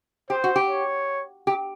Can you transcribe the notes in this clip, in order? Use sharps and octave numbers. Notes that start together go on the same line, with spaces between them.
G4 C5
F#4
G4
C#5
G4